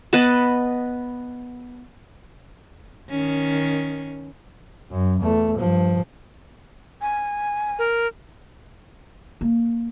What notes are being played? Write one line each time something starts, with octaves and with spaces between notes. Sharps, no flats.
B3 B4 D#5 A5
D#3 C#4
F#2
E2 A3
G2 F3
G#5
A#4
A#3